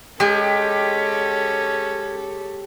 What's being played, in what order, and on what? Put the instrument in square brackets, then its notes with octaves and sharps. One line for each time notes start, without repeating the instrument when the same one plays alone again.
[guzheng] G#3 G#5 [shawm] C#4 [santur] G4 [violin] A4 C#5